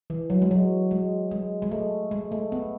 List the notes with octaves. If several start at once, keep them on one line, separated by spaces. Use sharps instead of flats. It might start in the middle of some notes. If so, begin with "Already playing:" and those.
E3
F#3
G#3
F#3
G#3
G#3
G#3
A3
G#3
A3
B3